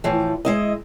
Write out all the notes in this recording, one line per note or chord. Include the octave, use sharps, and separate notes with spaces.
A2 E3 F3
G#3 E4 D#5